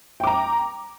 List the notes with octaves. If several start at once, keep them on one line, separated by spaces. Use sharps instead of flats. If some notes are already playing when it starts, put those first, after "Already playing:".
G5 A#5 D6